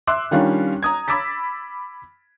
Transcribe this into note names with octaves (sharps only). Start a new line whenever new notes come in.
E5 C6 D6 E6 F#6
D#3 G3 C#4 D4 F4
A#5 D#6 G#6
B5 D6 E6 A6 B6